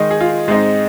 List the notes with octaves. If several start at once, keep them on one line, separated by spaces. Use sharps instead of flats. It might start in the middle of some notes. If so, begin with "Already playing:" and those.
Already playing: D#3 G#3 D#4
G#4
F4
G#2 G#3 C4 D#4